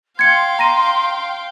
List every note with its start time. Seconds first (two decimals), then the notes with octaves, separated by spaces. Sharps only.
0.19 F5 G5 C6 G#6 C#7
0.59 A#5 A#6 D#7